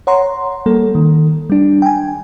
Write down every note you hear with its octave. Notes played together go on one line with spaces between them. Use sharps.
C#5 F#5 A#5 C6
G3 A#3 A4
D#3
G3 D4
G5 G#5